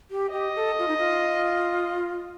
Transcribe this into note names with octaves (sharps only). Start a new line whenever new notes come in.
G4
G4 D#5
A4
F4
D#4
F4